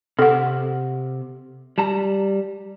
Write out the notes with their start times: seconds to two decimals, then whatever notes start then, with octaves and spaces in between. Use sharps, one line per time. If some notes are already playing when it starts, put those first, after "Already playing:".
0.19 C3 A4 F#5
1.78 G3 A5 A#5